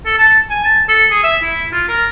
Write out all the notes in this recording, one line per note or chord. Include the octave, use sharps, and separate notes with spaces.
A4
A5
G#5
A5
A4
G#4
E5
E4
F4
A#4